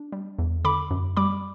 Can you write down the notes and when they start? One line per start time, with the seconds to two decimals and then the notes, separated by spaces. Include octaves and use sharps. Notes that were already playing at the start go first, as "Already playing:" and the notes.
Already playing: D4
0.12 G3
0.39 E2
0.65 D3 B5 D6
0.91 F#2
1.17 G3 B5 D6